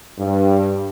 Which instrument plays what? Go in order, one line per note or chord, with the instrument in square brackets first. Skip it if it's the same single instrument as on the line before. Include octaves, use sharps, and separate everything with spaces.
[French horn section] G2